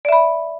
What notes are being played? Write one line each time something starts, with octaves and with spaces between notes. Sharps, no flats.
D5 E5 B5